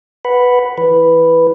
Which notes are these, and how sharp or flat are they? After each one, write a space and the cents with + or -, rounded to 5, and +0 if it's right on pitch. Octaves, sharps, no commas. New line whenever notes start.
B4 +0 F#5 +0 B5 +0
E3 +0 B4 +0